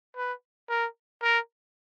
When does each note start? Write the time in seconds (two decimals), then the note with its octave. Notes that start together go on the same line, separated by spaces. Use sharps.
0.17 B4
0.70 A#4
1.23 A#4